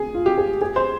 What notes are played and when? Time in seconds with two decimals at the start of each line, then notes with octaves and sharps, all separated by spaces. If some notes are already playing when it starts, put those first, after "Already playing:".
Already playing: G#4
0.14 F4
0.26 G4
0.38 G#4
0.61 G#4
0.76 C5